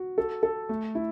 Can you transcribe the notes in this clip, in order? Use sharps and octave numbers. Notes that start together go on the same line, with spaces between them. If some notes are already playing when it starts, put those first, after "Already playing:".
Already playing: F#4
A4
A4
A3
E4